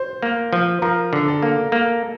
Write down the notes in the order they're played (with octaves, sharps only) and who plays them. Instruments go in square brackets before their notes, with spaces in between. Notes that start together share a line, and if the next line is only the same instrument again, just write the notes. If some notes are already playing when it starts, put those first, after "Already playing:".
Already playing: [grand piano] C5
[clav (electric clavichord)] A#3
F3
[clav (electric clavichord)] F3 [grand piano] A#4
[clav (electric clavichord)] D3
[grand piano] A4
[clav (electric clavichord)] A#3
A#3